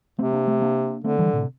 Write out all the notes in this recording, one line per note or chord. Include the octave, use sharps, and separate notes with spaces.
C3 A3 C4
A#3 D4
A3 C4
A#3 D4
D3 A3 C4
E3 G3
A2 C3